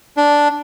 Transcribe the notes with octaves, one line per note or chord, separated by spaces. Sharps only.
D4